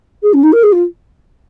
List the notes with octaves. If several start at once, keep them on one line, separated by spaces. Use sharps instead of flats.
G#4
C#4
D#4
A#4
G#4
F4